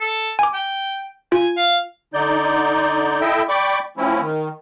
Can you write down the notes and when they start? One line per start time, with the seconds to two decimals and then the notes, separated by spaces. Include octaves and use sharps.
0.01 A4
0.39 G#5 D6
0.54 G5
1.32 F4 G#5
1.57 F5
2.14 D3 D#4 D5 G6
3.21 E4 A4 D#5 E5 G5
3.49 D5 G5 B5 C#6 D6
3.97 F3 A3 C4 C#4 E4
4.21 D#3